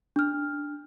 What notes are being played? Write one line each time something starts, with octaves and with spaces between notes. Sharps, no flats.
D4 F6